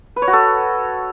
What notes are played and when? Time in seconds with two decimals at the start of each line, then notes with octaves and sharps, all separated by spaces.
0.16 B4
0.22 C#5
0.27 F#4
0.33 A4